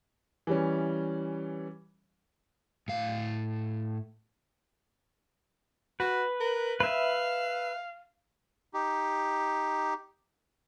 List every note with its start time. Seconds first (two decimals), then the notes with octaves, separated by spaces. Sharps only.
0.47 E3 G3 C#4
2.88 A2 F5
6.00 F#4 B4
6.40 A#4
6.80 B4 E5 F5
8.74 D#4 G4